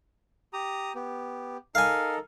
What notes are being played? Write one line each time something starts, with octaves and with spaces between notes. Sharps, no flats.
G4 A#5 D#6
B3 G4
D#4 A4 A#4 F5 G#5